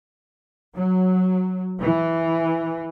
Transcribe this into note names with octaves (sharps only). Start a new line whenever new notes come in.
F#3
E3